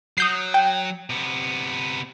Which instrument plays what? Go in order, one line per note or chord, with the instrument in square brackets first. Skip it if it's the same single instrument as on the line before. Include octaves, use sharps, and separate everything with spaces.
[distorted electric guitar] F#3 [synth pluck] D#6 G6 C7
[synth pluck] G5
[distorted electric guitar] C3 B3